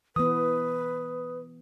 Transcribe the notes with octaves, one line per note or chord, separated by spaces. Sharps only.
E3 B3 B4 D#6